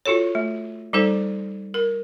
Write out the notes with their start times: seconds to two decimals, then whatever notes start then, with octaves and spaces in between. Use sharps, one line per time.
0.06 F4 F#4 A4 C#5
0.35 A3
0.93 G3 D#4 A4 C5
1.74 A#4